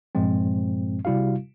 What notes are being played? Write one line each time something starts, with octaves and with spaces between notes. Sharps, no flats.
G2 A#2 F3 G#3 C4
C3 G3 E4 F#4 F5